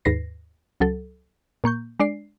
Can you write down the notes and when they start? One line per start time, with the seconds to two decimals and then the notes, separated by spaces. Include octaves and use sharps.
0.05 D#2 G#2 B4 A#6 C7
0.80 C#2 F#3 A4
1.64 A#2 A#3 C#6 G6
2.00 G#3 D4 D5 C7